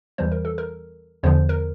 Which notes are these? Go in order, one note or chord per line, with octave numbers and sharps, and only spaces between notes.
E2 E3 G3 C5
A#4
A4
A#4
E2 D3 F3 C5
A#4